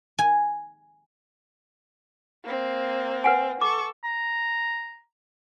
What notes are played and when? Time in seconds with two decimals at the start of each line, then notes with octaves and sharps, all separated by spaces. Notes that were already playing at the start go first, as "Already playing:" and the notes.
0.19 G#5
2.44 A#3 C4
3.24 B4 F#5 G#5
3.61 A4 C#6 D6
4.04 A#5